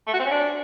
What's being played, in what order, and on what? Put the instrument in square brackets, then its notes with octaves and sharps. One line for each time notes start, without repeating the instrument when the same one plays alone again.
[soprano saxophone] A3
F#4
C4
C#4
D4